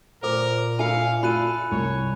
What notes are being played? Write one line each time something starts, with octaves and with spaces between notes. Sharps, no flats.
A#2 A#4 C5 D6
E4 F5 G#5 C#7
F4 A4 B5 F#6 D#7
C2 C#5